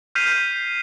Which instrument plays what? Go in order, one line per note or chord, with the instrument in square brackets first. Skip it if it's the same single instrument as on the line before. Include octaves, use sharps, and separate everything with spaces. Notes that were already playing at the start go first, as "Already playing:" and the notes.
[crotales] F6 G6 B6 C7 D#7 F7